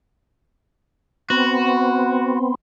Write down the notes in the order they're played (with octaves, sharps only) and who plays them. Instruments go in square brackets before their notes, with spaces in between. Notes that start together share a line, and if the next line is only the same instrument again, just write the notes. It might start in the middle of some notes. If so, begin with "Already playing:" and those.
[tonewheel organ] B3 C4 [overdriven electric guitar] F#4